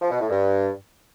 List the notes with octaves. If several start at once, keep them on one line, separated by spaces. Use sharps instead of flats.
F3
B2
A2
G2